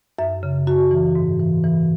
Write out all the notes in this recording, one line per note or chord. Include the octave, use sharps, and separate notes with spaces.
F#2 E5
C#3
F#2 F#4
E3
G#2
E3
E3